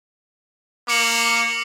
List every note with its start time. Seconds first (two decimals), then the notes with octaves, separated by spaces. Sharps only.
0.88 A#3 D6 C#7 F#7